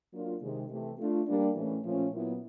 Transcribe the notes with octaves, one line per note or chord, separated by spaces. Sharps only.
F#3 A#3 D4 F4
C3 D#3 G#3
C3 E3 A3
A3 D4 F4
G3 A#3 D4
A2 E3 A3 C#4
A#2 F3 A3 C#4
A#2 F#3 B3 E4